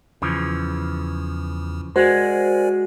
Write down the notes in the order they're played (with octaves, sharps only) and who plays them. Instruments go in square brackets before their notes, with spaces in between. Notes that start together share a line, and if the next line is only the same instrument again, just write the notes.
[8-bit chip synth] E2 [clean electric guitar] C#3 E3 F3
[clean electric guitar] G#3 [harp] F#4 [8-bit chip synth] A#4 D5 G#5 [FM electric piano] C5